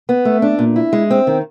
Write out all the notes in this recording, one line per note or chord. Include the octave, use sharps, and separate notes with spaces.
B3
A3
D4
A#2
E4
G#3
C4
D#3